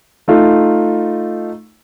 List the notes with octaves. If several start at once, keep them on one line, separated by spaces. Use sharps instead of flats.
A3 D#4 F4